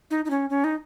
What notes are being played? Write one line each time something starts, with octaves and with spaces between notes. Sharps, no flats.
D#4
D#4
C#4
C#4
D#4